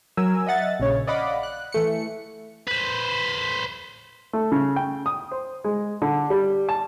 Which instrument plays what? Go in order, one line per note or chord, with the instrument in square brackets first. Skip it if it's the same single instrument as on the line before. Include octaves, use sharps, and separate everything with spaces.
[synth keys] F#3 A#4 G#5 E6
D#5 E5 F#5 A6
A#1 C#3 C#5
D5 D#5 F5 F#5 B5 D6
F#6
E3 A3 C#7
[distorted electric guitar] B4 C5
[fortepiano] A3
C#3
G5
D#6
C5
G#3
D3
G3
A5